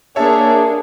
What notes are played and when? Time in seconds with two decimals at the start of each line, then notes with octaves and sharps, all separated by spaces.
0.16 A#3 D4 G#4 C#5 E5 A5